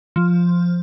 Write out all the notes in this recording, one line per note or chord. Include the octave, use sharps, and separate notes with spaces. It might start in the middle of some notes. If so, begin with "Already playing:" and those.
F3